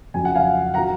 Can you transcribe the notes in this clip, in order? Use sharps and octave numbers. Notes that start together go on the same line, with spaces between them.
F2 C#3 F#3 G#5
F#5
F5 G#5
D#3 F#3 F#5 A#5